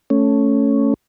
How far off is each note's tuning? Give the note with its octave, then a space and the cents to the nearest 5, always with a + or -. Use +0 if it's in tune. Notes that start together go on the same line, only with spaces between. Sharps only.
A3 +0 C#4 +0